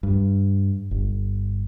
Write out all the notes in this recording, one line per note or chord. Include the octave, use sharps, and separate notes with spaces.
G2
G1